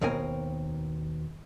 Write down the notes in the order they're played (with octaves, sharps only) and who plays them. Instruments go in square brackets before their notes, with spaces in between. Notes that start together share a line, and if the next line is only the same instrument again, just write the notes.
[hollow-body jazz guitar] D#2 B2 C4 A#4 G#5